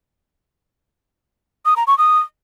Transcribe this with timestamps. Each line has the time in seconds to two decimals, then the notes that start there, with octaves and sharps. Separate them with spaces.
1.65 D#6
1.76 A#5
1.87 C#6
1.98 D#6